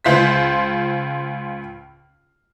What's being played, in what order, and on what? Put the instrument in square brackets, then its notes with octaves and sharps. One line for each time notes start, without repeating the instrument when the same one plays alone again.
[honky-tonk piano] C#2 F4 C5 B6